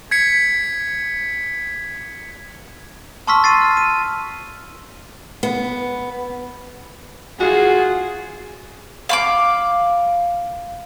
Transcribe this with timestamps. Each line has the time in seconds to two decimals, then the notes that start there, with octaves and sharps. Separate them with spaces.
0.11 G#6 B6 C#7
3.27 A5 C6 C#6 E6 F6 B6
3.44 A6 C7 D#7
3.62 F6
3.77 D#7
5.43 B3
7.40 F4 F#4 G#4
9.09 F5 B5 D6